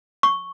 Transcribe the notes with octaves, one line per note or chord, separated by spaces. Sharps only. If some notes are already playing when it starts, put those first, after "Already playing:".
C#6